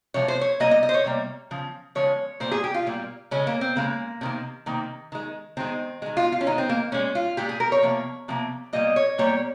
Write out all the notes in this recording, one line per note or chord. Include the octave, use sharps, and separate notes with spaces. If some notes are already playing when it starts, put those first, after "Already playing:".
C3 F3 G#3 C#5
C5
C#5
C3 G3 A#3 D#5
D#5
D#5
C5
C#5
C3 G3 A#3
C#3 F3
C#3 F3 G#3 C#5
A#2 G3 A#3 C5
G#4
G4
F4
A#2 G3 A#3
C#3 G#3 C#4
A#3
C4
C#3 G#3 A#3
C3 D#3 A#3
C3 D#3 A#3
D#3 G#3
D#3 G#3 C4
D#3 G#3
F4
F4
C#4
D#3 G#3 D#4
C4
A#3
A#2 G#3 C#4
F4
A#2 G#3 G4
G#4
A#4
C#5
C3 F3 A#3
C3 F3 A#3
A#2 G3 A#3 D#5
C#5
A#2 G3 A#3 C#5